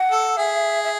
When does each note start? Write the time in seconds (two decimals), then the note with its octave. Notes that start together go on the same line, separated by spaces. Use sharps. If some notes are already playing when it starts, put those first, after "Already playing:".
Already playing: F#5
0.11 A4
0.37 G#4 E5
0.84 E5